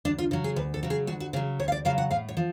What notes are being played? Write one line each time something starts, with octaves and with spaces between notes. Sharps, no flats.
D2 D4
F4
C#3 F#3
G#4
D2 B4
A4
C#3 F#3
G#4
D2 F#4
F#4
C#3 F#3 G#4
D2 C#5
F5
D5
C#3 F#3 F5
F#5
A2 F5
C#5
F3